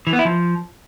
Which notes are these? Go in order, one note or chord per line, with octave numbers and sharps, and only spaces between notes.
E3
B3
E4
F3